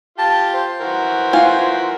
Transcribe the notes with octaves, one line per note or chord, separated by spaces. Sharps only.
F4 G4 A5
C5
E3 F#4 A#4
F4 G#5